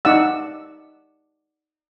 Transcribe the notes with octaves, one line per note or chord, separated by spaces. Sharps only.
D#4 D5 F#5 E6